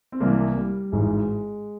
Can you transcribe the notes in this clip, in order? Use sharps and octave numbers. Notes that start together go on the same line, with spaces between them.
C4
C2 C3 E3 A#3
G3
G#1 G#2 E3 G#3